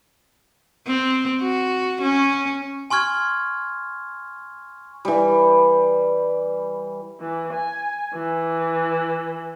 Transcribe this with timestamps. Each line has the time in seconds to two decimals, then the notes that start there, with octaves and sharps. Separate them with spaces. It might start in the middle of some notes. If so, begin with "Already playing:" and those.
0.87 C4
1.41 F#4
2.02 C#4
2.90 G#5 C6 C#6 F6 G#6
5.05 E3 G3
7.21 E3
7.53 G#5
8.14 E3